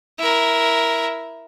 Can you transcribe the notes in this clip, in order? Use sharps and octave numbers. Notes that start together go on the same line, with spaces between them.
E4 A#4